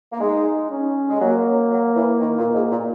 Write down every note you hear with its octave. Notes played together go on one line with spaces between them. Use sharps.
A#3
G#3 D#4
C#4
G#3
F#3 A#3
F#3
E3
D#3
A#2
G#2
A#2